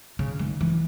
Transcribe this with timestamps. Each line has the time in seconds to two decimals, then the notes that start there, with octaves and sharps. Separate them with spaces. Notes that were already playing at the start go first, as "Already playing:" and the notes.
0.19 C#3
0.39 D#3
0.61 E3